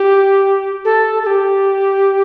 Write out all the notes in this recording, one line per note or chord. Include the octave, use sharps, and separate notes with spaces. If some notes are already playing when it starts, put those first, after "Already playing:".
Already playing: G4
A4
A4
G4